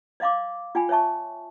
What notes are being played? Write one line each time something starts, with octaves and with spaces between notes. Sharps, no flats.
D5 D#5 F5 C6 D6
F4 D5 G5 G#5 B5
C#5 D5 E5 A5 C#6